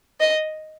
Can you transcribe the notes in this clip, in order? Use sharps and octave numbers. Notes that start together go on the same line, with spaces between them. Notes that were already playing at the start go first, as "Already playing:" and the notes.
D#5